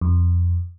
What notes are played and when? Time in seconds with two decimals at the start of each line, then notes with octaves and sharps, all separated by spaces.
0.01 F2